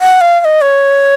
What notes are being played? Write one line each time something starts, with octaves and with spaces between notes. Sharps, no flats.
F#5
F5
F5
D#5
C#5